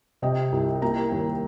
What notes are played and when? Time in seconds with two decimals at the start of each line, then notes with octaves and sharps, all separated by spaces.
0.22 C3 D#5 G5
0.52 C2
0.82 A#3 G5 A#5
1.12 D#2